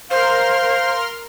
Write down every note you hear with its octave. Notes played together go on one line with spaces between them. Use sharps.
A#4 C5 F5 C6 F6